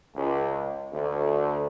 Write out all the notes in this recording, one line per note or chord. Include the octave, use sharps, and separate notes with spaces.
C#2
D2